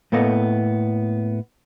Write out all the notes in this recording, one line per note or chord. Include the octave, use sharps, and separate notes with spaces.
A2 A#3 B3 A4 D#5